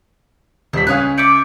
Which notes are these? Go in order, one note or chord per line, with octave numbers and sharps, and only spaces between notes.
D#1 G3 C5 B6
C#2 C#4 F5 G#5 D#6 F#6
D5 E5 D6 G6 C#7 D7